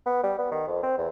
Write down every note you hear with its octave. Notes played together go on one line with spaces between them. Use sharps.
B3
G3
B3
D#3
F2
C4
E2